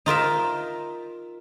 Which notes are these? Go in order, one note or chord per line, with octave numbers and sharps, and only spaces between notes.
D#4 F4 A#4 E5